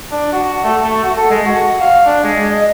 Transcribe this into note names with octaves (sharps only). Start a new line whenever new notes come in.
D4
F#4
A3
A3
F#4
A4
G#3
F#4
F5
D4
G#3
D#5